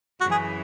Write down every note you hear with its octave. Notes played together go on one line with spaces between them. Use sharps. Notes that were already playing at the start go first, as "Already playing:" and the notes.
F#2 C#3 E3 F#4
G#4